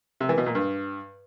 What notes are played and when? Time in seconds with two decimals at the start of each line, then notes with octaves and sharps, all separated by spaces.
0.21 C3
0.29 E3
0.38 B2
0.46 A#2
0.55 G2